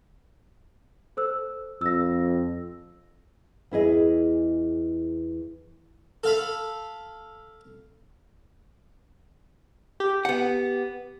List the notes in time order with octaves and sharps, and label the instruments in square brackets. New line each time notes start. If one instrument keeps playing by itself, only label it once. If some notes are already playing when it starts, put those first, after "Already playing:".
[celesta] A4 C5 E6
[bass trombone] F2 [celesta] E6 A#6
[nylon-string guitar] E2 E4 G#4 D#5
[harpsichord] A4 F5 B5
[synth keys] G4
[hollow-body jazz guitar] B3 F#5